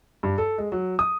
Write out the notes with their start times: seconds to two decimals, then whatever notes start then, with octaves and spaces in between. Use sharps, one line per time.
0.23 G2
0.38 A4
0.58 G#3
0.72 F#3
0.99 D#6